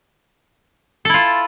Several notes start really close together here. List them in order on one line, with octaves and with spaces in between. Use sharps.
A4 E4 F4